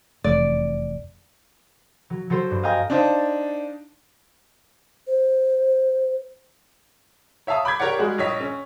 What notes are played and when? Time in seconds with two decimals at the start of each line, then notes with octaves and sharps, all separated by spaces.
0.24 F1 E2 D5
2.10 F#3
2.30 F#3 A4 C5
2.51 G2
2.63 D#5 F5 G5 G#5 A#5 D#6
2.90 D4 D#4 C5 F5 A5
5.07 C5
7.47 C#5 E5 F5 A5 D#6
7.65 B5 D6 G6 G#6 B6
7.80 G4 A#4 C#5 D5 F#5
7.98 G3 G#3 F#4 G#4
8.18 A#1 G2 C#5 D#5 B6
8.41 C#4